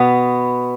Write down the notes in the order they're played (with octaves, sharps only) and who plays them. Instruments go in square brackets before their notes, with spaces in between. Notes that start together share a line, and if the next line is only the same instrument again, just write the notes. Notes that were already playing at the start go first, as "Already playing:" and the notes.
Already playing: [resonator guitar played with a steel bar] B2 B3